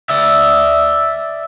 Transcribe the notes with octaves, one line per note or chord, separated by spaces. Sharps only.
D5 E5